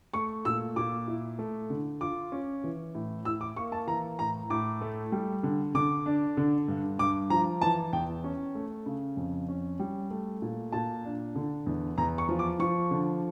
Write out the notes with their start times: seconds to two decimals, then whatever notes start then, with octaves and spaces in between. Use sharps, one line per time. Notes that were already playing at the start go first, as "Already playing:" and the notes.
0.14 A3 C#6
0.45 A#2 E6
0.76 A#2 D6
1.08 E4
1.39 A3
1.70 D3
2.01 F4 D6
2.32 C#4
2.64 E3
2.95 A2
3.25 E4 E6
3.41 D6
3.56 A#3 C#6
3.72 A5
3.87 E3 A#5
4.19 A2 A#5
4.50 A2 D6
4.81 A3
5.12 G3
5.43 D3
5.75 D3 D6
6.06 D4
6.37 D3
6.68 G2
6.99 G2 D6
7.30 F3 A#5
7.61 E3 A5
7.93 E2 G5
8.24 C#4
8.55 A3
8.86 C#3
9.17 F2
9.48 C#4
9.79 G3
10.11 A3
10.42 A#2
10.72 A#2 A5
11.04 D4
11.35 D3
11.66 E2
11.98 E2 A#5
12.18 C#6
12.29 F3
12.39 D6
12.60 F3 C#6
12.91 D3